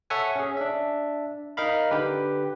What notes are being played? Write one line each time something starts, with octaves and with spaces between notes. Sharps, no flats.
A4 C#5 E5 F#5 G#5
C#4 G#4
D4 E5
D#4 A#4 D#5 F5 B5
D3 G4 B4